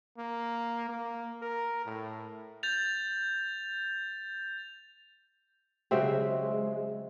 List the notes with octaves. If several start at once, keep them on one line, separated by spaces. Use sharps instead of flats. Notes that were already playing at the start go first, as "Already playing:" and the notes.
A#3
A#3
A#4
A2
G6 A6 F7
C#3 F#3 G#3 C4 G4 C5 E5